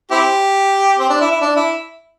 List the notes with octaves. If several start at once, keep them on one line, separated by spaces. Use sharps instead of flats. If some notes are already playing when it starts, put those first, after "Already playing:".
C4 E4 G4
C4
D4
E4
E4
D4
E4